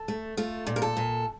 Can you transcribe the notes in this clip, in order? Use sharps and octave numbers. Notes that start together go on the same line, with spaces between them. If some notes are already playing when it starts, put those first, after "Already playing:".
Already playing: A4
A3
A3 F4
A#2
A#4
A4
A#2